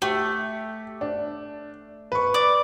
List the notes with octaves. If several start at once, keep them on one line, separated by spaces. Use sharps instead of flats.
A3 G4
D4
B4 C#6
D5